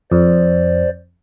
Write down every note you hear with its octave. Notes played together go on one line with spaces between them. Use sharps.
F2 C5 D5